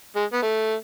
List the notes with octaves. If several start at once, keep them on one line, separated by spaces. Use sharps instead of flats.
G#3
B3
A3